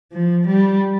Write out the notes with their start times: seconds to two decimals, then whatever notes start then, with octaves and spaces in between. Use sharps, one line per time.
0.13 F3
0.47 G3